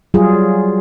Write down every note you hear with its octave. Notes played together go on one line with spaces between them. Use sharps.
F#3 G3 F4 G#4